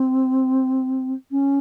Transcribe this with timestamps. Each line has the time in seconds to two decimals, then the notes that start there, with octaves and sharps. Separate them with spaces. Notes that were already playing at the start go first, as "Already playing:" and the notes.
Already playing: C4
1.31 C#4